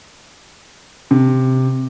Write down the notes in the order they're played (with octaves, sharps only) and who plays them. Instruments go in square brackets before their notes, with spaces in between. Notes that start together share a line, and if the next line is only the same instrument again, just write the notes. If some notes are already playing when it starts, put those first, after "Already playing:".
[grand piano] C3